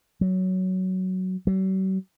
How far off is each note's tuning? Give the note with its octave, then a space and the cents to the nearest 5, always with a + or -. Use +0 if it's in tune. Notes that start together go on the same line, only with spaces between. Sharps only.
F#3 +10
F#3 +45